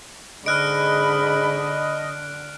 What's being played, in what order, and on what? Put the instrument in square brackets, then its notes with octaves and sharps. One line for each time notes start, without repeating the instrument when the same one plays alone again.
[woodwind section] G#2 G#4 B5 [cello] D3 [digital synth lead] D#5 [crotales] F6 F#6 D7